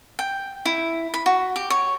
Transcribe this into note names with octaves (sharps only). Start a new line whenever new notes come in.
G5
E4
B5
F#4
G4
C#5